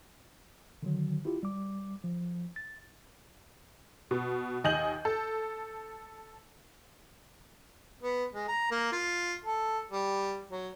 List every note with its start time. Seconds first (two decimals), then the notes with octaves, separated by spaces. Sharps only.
0.83 D3 D#3 F#3
1.25 E4 F4 G4
1.43 G3 D6
2.04 F3
2.56 A6
4.11 B2
4.64 D#2 D#5 G#5 G6 F#7
5.05 A4
8.03 B3
8.34 G#3
8.48 A#5
8.71 A#3
8.93 F4
9.45 A4
9.92 G3
10.51 F#3